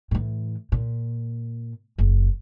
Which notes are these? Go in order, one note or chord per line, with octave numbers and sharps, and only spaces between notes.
A2 E3
A#2
F#1